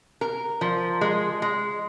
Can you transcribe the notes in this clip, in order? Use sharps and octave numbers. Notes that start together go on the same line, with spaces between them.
A#4
F3
G#3
G#3